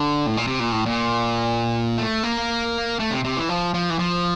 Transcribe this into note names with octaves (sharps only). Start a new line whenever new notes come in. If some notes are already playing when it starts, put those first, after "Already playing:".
Already playing: D3
A2
A#2
C3
A#2
A2
A#2
A3
A#3
A3
C3
C3
E3
F3
F3
E3
F3